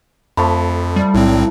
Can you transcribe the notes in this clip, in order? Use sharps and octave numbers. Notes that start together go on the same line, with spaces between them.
F2 F3 A3 B5
G3
B1 A2 C4 E4